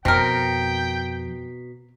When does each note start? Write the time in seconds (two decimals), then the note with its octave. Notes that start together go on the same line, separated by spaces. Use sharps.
0.05 F2 B2 C4 A#4 G5